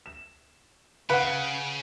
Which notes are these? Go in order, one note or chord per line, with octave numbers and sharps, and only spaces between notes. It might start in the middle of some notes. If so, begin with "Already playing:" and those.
E7
C#3 B4 F5 F#5